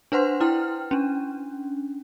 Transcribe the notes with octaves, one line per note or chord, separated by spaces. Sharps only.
D4 B4 C5 F#5 C6
E4 G5 F6
C#4 D4